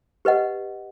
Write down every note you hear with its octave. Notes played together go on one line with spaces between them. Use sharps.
G4 B4 D#5 F#5